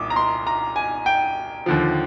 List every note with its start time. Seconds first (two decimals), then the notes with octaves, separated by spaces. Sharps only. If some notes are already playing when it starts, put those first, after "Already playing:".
Already playing: C2 A#2 D6 D#6
0.10 A#5
0.16 C6
0.47 A#5
0.76 G#5
1.06 G5
1.66 D#2 D3 F3